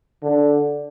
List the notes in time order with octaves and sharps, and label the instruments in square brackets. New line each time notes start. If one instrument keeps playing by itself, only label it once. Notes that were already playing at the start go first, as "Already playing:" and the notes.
[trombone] D3